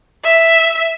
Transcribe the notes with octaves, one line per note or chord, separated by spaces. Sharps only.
E5